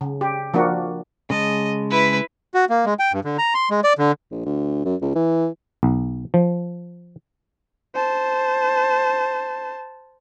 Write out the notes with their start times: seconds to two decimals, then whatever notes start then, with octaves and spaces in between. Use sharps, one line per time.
0.01 C#3
0.21 G4
0.54 F3 A#3 D4 F#4
1.30 C#3 G#3 D#5 A5
1.91 E4 B4
2.54 F#4
2.70 A#3
2.85 G#3
2.99 G5
3.13 G2
3.25 D3
3.38 A#5
3.54 C6
3.71 G#3
3.84 D5
3.99 D3
4.31 A#1
4.46 D2
4.85 F#2
5.02 C#2
5.15 E3
5.83 B1
6.34 F3
7.95 C5 A5